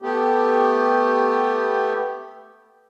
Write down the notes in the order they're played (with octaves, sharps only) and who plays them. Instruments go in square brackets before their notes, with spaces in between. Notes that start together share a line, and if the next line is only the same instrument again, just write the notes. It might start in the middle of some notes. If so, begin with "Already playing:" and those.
[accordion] A3 B3 G4